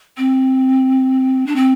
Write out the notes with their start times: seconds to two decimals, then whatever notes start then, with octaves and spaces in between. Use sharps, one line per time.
0.18 C4
1.47 D4
1.56 C4